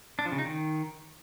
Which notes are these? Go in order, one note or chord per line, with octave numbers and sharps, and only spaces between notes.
D4
F3
C#3
D#4
D#3